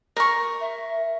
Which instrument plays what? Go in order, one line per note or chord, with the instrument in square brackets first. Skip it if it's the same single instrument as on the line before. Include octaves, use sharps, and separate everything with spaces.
[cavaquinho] A#4 C#6
[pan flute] E5